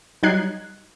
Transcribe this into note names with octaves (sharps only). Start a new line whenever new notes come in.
F#3 G3 D#4 F#6 G#6 C7